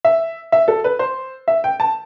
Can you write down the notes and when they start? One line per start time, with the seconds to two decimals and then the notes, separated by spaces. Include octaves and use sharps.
0.05 E5
0.52 E5
0.68 A4
0.84 B4
0.99 C5
1.48 E5
1.64 G5
1.80 A5